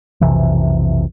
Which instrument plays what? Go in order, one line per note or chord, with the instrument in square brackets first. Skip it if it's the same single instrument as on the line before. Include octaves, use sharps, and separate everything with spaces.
[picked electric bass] B1 F2 C3 E3